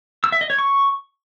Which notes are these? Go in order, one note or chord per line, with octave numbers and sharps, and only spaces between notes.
E6
E5
D#5
C#5
C#6